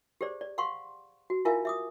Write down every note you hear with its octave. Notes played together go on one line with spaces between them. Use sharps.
G4 G#4 C5 D5
D5
F5 F#5 C6 C#6
F#4
E4 F4 A#4 E5 F5 G#5
E5 D6 D#6